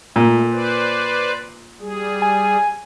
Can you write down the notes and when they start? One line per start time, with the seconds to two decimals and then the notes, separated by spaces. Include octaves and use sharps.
0.16 A#2 A3
0.52 B4 C5 D5
1.80 G3 G#4
2.22 G#5